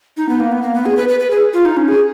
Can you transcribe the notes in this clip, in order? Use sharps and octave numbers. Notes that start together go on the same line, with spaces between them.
D#4
B3
A#3
B3
A#3
B3
G#4
B4
B4
B4
G#4
F4
D#4
C#4
G#4